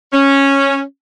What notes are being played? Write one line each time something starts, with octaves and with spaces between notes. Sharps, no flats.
C#4